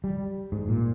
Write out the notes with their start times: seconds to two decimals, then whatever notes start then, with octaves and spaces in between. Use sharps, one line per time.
0.04 G3
0.52 G#2
0.68 A#2